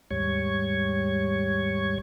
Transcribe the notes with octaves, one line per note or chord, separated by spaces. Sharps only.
D#2 G#2 G3 C#5 C#6 G#6